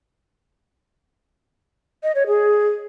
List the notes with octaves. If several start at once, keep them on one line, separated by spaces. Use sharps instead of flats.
D#5
C#5
G#4